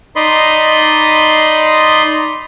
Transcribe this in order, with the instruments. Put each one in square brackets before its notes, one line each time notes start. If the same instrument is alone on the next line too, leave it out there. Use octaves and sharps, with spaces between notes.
[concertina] D#4 D5 D#5 B5 C6